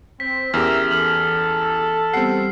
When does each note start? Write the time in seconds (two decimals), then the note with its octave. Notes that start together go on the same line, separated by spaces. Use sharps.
0.20 C4 B6
0.54 E2 C#4 G4 G#4 A#4 E5 F6
0.91 E3 A4 F6 F#7
2.13 G3 B3 C4 G4 F#5 C7